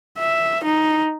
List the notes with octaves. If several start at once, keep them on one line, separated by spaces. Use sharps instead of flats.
E5
D#4